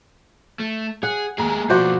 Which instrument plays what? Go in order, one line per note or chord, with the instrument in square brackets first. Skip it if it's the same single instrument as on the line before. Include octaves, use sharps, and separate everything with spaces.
[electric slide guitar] A3
[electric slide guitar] G#4 [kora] F#5
[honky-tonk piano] D#2 A#5 [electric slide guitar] G#3 A3 G#4
[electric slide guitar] B2 F3 [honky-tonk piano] A#3 D5 [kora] F#4 C5